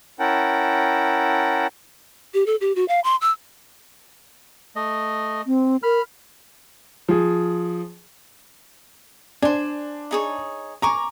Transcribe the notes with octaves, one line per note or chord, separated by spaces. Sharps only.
C#4 E4 A#4 F#5 G5 A5
G4
A4
G4
F#4
F5
C6
E6
A3 D#5
C4
A#4 B5 F6
F3 G#4
D4 C5 G#5
D#4 G#4 C#5
G#5 A#5 C#6 D6